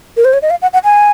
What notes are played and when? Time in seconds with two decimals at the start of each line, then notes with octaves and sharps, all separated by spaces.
0.17 A#4
0.25 C5
0.33 C#5
0.42 D#5
0.50 F5
0.62 F#5
0.73 F#5
0.84 G#5